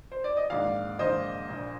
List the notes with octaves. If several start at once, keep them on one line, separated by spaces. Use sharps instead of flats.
C5
D5
D#5
A#1 G#2 D#3 D5 F5
A#1 G#2 D#3 C5 D#5
A#1 A#2